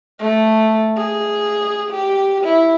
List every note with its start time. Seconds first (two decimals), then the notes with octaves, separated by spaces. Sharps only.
0.20 A3
0.97 G#4
1.91 G4
2.44 E4